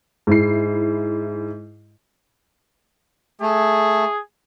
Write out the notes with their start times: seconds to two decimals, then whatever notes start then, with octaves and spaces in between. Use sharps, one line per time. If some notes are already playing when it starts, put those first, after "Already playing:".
0.27 G#2 E4 C7
3.41 A3 G#4